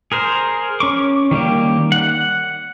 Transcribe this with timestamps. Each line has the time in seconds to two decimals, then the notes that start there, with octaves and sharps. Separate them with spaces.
0.12 G#4 A#4 C5
0.80 C#4 C#6 D6
1.31 D#3 G3 A#3 G4
1.92 F#5 F#6